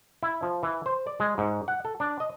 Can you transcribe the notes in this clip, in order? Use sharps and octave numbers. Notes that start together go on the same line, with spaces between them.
E4
F3
E3
C5
D5
G#3
G#2
F#5
A4
D4
D#5